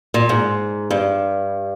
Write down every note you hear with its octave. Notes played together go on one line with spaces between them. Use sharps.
A#2
G#2
G2